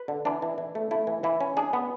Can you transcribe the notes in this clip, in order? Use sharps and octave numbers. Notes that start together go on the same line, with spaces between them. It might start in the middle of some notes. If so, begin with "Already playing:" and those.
Already playing: B4
D3
E3 D4
E3
E3
A3
A3 E4
E3
E3 E4
C#4
D4 G#4
B3